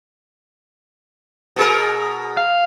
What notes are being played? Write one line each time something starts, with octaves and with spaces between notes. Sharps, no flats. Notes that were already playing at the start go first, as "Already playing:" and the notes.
B2 G#4 A#4
F5